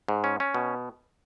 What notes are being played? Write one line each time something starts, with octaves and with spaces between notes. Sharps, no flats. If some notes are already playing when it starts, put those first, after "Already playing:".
G#2
C#4
C#4
B2